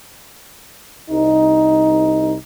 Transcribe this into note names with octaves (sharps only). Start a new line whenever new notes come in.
C2 D#4